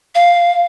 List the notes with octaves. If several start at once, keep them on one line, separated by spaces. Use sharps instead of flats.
F5